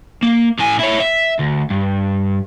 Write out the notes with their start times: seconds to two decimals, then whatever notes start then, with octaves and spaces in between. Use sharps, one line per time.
0.23 A#3
0.59 A2 G#5
0.80 E4 C#5
1.01 E5
1.39 D2
1.70 G2